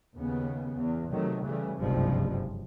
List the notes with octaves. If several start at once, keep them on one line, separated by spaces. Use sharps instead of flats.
D#2 C#3 B3
E2
C3 D#3 F#3 A3
C#3 E3 G3 A3
F#1 C2 G2 C3 F3 G#3